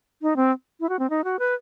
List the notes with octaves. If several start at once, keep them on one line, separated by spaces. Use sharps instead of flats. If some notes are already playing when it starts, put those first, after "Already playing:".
D#4
C4
E4
F#4
C4
D#4
F#4
B4